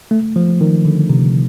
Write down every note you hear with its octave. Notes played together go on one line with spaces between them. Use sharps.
A3
F3
D#3
D3
C3